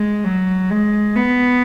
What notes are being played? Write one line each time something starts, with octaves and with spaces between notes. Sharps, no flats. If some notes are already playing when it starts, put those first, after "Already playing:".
Already playing: G#3
F#3
G#3
B3